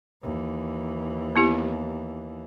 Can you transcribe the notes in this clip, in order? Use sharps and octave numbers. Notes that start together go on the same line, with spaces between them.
D#2 E3
B3 E4 G4